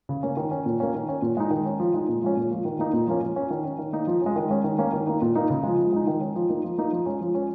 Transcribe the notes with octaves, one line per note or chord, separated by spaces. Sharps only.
C#3
A#3 C#4
D#3
C#4
A#2
A#3 C#4
D#3
C#4
A#2
G#3 D#4
D#3
C#4
F3
G#3 D#4
A#2
F3 G#3 C#4
A#2
F3 A#3
D#3
A#3 D#4
A#2
F3 A#3 C#4
F3
C#4
D#3
C#4
D#3
A#3 D#4
F3
C#4
G#3
D#3
G#3 C#4
D#3
A#3 C#4
D#3
A#3 D#4
A#2
A#3 D#4
C#3
F3 G#3
F3
G#3 D#4
D#3
C#4
F3
A#3 D#4
F3
A#3 D#4
F3
G#3 C#4
F3
C#4